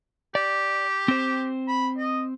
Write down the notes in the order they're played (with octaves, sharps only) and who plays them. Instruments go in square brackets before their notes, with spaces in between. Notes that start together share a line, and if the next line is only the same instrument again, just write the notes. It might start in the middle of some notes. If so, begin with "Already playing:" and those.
[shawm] G4 [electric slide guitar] D5
[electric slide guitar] C4 C5
[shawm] B5
D#5